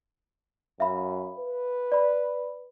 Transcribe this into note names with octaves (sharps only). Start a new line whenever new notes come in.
F#2 E5 F5 B5
B4
D5 B5